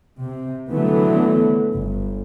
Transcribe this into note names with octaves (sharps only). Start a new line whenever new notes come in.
C3
D3 E3 F#3 A3 B3
G1